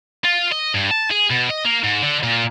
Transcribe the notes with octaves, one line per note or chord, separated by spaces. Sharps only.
F4
D#5
G2
A5
G#4
B2
D#5
A#3
G#2
D3
A#2